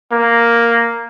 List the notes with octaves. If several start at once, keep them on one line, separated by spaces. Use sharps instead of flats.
A#3